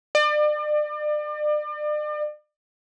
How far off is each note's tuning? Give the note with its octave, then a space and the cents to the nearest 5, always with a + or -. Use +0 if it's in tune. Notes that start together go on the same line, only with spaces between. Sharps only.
D5 +35